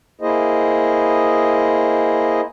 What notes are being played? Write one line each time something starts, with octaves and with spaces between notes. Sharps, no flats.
A#3 E4 G#4 C5 D#5